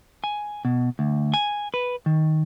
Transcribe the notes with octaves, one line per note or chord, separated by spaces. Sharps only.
G#5
B2
D2
G#5
B4
D#3